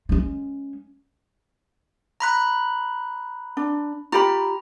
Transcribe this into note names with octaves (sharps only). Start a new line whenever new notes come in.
G#3 C#4
A#5 B5 F#6
D4
F4 G4 A#5 B5